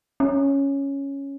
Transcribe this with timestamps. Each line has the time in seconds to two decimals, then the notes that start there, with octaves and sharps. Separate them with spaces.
0.20 C#4